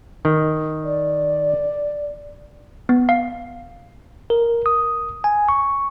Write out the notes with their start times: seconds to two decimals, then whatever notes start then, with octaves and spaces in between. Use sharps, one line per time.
0.25 D#3
0.84 D5
2.89 B3
3.09 F5
4.30 A#4
4.66 D#6
5.24 G#5
5.49 C#6